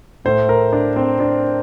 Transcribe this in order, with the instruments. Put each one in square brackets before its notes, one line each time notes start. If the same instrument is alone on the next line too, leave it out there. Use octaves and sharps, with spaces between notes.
[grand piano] A2 A3 C5
A#4
D4
C4
D4